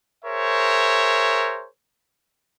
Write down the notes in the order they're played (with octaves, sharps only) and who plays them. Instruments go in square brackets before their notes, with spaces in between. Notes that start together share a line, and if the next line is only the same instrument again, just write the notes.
[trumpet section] G#4 A#4 C5 C#5 E5